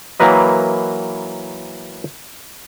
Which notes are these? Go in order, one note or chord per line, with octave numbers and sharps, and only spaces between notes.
E3 F#3 A#3 A#4 B4 D#5